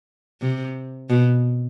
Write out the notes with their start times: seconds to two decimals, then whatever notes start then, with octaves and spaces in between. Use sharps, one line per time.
0.41 C3
1.10 B2